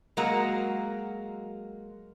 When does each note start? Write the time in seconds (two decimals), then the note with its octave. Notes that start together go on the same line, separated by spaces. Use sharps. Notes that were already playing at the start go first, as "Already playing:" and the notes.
0.17 F#3 G#3 A#3 F#4 A#4